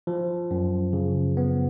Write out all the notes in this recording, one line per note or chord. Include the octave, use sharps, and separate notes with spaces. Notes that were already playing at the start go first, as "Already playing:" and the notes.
F3
F#2
C#3
B3